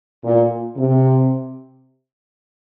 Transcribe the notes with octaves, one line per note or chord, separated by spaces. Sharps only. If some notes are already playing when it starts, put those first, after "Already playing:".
A#2
C3